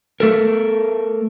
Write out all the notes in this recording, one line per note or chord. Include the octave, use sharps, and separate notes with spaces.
A3 A4 A#4